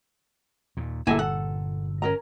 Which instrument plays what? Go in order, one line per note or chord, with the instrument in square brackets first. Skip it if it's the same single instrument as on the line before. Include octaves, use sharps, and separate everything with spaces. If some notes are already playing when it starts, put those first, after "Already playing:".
[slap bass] D#2 A#2
[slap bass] G1 A#2 [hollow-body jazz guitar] A#3 E4 [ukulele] A4 E5 G#5
[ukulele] A4 [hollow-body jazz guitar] F#5
[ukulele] C#4 A#4 A#5